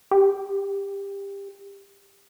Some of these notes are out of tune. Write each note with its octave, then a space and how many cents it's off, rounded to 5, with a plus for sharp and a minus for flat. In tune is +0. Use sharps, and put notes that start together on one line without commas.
G4 +20